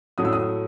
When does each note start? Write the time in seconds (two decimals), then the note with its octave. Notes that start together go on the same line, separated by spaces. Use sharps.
0.18 A2 F#3 A3 D#6
0.25 E6
0.33 D#6